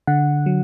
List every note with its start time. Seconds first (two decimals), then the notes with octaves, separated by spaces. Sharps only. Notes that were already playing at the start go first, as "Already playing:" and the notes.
0.07 D3 F#5
0.46 F#3